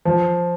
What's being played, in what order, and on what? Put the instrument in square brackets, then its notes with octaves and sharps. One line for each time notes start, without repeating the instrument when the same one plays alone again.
[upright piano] F3